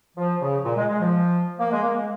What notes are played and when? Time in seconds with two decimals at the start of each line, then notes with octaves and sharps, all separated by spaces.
0.17 F3
0.41 C#3
0.65 A#2
0.77 G#3
0.89 G#3
1.01 F3
1.60 A#3
1.72 G#3
1.83 A#3
1.95 G#3